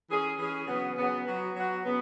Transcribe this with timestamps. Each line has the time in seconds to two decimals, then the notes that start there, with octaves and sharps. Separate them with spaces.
0.09 E3 C#4 G#4
0.38 E3 C#4 G#4
0.68 C#3 F#3 B3
0.97 C#3 F#3 B3
1.26 F#3 B3 F#4
1.55 F#3 B3 F#4
1.84 C#3 F#3 B3